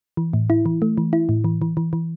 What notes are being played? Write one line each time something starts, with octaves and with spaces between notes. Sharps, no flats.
E3
A2
E4
E3
A3
E3
E4
A2
E3
E3
E3
E3